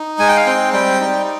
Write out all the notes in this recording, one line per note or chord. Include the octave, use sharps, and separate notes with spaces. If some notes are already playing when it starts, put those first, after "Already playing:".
Already playing: D#4
G#3 G#5
G5
F5
C4 G5
G3 G5
D#4